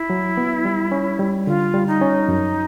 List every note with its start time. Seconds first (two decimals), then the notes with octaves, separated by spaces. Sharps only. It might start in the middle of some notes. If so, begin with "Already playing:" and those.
Already playing: E4
0.10 F#3
0.37 B3
0.65 G3
0.92 C#4
1.19 G3
1.47 D3 F4
1.74 G3
1.87 D#4
2.01 C#4
2.29 F#2